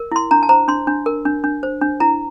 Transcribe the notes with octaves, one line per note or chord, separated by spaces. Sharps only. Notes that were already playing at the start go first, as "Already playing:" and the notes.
Already playing: A#4
E4 C6
D4 A#5
A5
C5 A#5
D4 C6
D4
A#4
D4
D4
C5
D4
E4 A#5